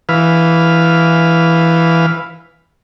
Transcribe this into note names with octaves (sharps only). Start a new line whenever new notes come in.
E3 B4 F5